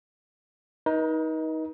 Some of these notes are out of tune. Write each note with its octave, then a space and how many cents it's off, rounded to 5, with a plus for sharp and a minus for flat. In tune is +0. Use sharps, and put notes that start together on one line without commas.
D#4 +20 B4 -45